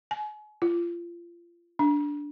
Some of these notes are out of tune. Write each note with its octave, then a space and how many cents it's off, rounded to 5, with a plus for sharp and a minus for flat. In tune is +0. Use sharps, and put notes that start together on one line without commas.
G#5 +35
F4 -25
D4 -10